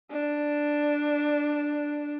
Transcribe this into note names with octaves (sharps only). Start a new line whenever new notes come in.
D4